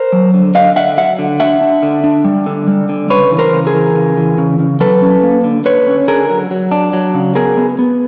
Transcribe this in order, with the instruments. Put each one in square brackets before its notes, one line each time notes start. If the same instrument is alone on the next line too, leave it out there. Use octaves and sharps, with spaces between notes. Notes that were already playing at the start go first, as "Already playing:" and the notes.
Already playing: [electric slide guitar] A#4 C5
F#3
D3
D3 D#5 F5
D3 E5 F#5
F#3 E5 F#5
D3
D4 E5 F#5
D4
D3
D4
G3
D3
G3
D3
C#3 B4 C#5
E3
A#4 C5
C#3
G#4 A#4
E3
C#3
E3
C#3
C#3
F#3 A4 B4
C#4
A#3
D3
D3 B4 C#5
C#4
D3 G#4 A#4
F#3
F#3
D4
F#3
C#3
B3 G#4 A#4
B3
B3